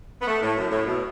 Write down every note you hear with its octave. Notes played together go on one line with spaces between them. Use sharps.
B3
A3
A2
F#2
A2
B2